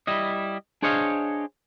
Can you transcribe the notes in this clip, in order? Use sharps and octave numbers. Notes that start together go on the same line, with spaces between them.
G3 E4 D#5
D4 G#4 C5 C#5 D#5 F5